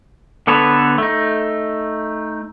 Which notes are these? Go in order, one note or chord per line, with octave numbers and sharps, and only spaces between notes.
D3 B3 A4 B4 C#5
A3 D#4